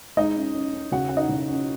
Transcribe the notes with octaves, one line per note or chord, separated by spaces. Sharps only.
G#3 D#4 D#5
C#4
C#4
C#4
C#3 F#4 F#5
C#4 F#5
D#4 D#5
C#3
C#4